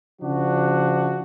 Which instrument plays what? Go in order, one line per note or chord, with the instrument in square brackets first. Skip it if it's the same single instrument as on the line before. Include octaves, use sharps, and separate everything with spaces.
[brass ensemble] C#3 F3 D4 F#4